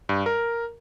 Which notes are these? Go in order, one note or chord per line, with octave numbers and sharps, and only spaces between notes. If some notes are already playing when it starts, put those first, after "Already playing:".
G2
A#4